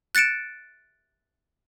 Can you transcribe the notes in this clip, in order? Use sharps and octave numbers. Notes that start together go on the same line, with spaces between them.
F#6 A6 C#7 D7 E7